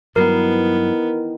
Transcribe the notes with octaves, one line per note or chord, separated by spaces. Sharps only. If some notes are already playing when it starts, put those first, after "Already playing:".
G2 D#3 E3 F#3 B3 A#4